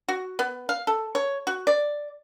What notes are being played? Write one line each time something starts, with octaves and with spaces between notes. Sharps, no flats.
F#4
B3
F5
A4
C#5
F#4
D5